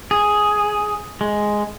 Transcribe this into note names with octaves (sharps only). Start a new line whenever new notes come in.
G#4
G#3